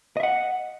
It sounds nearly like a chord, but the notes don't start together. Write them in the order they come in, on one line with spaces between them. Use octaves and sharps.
D#5 E5 F#5